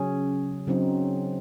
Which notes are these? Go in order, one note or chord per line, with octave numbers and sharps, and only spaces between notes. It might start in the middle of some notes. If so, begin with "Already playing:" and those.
Already playing: C#3 F#3 C#4 G#4
C#3 F#3 C4 D#4